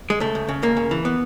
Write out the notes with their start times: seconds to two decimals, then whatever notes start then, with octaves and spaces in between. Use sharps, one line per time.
0.10 G#3
0.20 C#2 A3
0.35 C#2
0.49 C#3
0.63 C#2 A#3
0.77 C#3
0.91 E3
1.05 B3